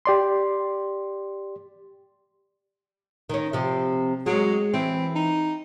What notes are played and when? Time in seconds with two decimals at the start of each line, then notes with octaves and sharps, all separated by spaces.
0.06 G4 D5 C6
3.29 D#3 C#4
3.53 C3 F3
4.26 F#3 G#3 G#4
4.74 E3 C4
5.15 D#4